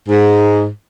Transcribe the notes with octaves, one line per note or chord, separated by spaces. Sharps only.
G#2